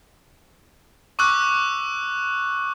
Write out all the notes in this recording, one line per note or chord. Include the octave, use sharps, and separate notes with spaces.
C#6 D6 E6 F#6